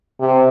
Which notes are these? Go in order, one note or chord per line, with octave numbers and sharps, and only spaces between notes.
C3